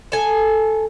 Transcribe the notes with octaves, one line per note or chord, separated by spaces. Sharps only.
A4 G#5